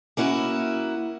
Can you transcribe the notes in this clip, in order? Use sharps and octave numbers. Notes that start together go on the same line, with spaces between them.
A#3 C#4 E4 F#4